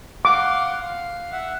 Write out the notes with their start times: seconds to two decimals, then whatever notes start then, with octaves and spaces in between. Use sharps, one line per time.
0.25 F5 F#5 C6 D6
0.81 F5
1.32 E5 F#5